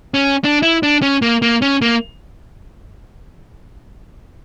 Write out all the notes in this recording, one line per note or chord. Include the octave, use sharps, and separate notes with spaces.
C#4
D4
E4
D4
C#4
A#3
A#3
C#4
A#3